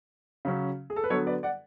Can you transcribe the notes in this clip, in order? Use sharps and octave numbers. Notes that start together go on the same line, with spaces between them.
C#3 F#3 C#4
G#4
A4
B4
D3 F#3 B3 A4 C#5
B4 D5
D5 F#5